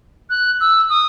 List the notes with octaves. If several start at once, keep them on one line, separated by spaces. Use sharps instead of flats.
F#6
E6
D#6